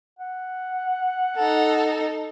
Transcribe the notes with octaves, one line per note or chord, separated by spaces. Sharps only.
F#5
D#4 A4